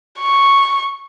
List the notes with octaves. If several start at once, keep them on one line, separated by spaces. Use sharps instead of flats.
C#6